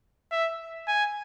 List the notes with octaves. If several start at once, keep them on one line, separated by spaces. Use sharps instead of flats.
E5
G#5